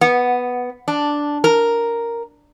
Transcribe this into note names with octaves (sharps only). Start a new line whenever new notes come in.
B3
D4
A#4